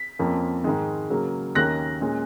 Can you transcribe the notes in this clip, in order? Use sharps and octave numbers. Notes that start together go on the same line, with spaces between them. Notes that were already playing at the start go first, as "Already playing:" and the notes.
Already playing: B6
F2 F3 A#3 C#4
G#2 D#3 G#3
C#3 F#3 A#3
D#2 D#3 A#3 C#4 F#6 A#6
A#2 G#3 C#4